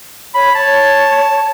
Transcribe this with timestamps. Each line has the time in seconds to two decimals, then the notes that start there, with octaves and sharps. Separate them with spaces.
0.34 C#5 B5
0.55 C#5 A5